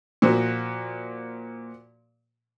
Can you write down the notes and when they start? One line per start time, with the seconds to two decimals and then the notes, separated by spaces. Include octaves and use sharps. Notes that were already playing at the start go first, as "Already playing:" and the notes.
0.22 A#2 F3 F#4